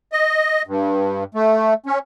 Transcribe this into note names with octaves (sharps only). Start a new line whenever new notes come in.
D#5
G2
A3
C#4